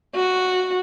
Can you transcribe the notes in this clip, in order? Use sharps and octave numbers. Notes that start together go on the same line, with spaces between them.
F#4